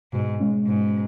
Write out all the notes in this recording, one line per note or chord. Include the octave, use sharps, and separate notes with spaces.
G#2 B2
G#3 C#4
G#2 B2